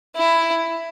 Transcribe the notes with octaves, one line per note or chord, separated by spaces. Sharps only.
E4